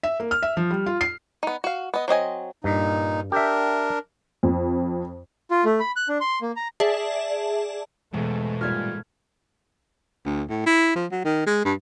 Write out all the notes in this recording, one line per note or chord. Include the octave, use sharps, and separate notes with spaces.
E5
A#3
F6
E5
F3
G3
F4
C7
B3 D#4
F#4 F5
B3 D#5
F#3 C4 D#5 G#5
G2 A#2 D#4
D4 G4 A#4 E5
F2
F4
A3
B5
F#6
D4
C6
A#3
A#5
G#4 D5 E5 A5
E1 G#2 B2 A3
A#2 G3 F6 G#6 B6
D2
A2
E4
F3
F#3
D#3
G#3
G2